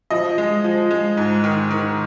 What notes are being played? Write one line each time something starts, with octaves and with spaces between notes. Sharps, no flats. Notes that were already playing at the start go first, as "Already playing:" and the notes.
F3 D#5
G#3
F3
G#3
G#2
D#3
D#3